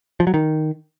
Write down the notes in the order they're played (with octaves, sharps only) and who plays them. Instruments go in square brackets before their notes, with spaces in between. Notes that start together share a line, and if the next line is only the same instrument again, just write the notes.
[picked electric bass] F3
F#3
D#3